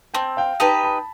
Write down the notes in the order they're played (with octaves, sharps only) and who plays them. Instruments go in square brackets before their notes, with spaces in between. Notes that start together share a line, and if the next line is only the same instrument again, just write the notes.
[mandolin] C4 [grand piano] G5 A5
[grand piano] F5 G5
[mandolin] D#4 G4 B4 [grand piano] G5 A5
[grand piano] A5 B5